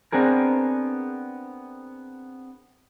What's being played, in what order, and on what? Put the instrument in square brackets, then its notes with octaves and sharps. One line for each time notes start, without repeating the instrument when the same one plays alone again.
[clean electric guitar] B3 C4 D4 G#4 A#4